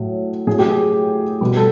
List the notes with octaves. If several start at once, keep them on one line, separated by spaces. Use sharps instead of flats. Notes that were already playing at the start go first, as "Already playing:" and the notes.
Already playing: A2 F#3
A2 F#3 G#4
G4
G#4
B2 G3
A4